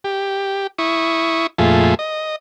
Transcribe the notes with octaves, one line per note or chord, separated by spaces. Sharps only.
G4
E4 C#6 D#6
F2 A#2 A3 F4 G#4 E5
D#5